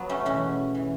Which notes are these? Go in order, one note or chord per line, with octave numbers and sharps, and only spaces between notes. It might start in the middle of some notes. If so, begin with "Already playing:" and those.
Already playing: F#3 B3
A3 C#4
E2 B2 C#4 F#4
E3